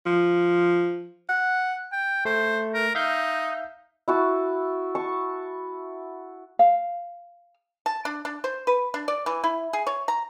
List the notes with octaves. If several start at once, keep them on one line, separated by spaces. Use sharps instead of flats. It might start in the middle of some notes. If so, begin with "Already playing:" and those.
F3
F#5
G5
A3 C5
A#4
D#4 E5 F5 G6
E4 F#4 A5
A5 C#6
F5
A5
D4
D4
C5
B4
D4
D5
E3
E4
G#4
C#5
A#5